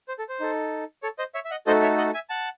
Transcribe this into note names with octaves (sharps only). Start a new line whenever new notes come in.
C5
A4
C5
D#4 A4
A4 C#5
C5 D#5
C#5 E5
E5
D#5 F#5
A3 D#4 F#4 A4 C5 D#5
C#5 E5
D#5 F#5
E5 G#5
F#5 A5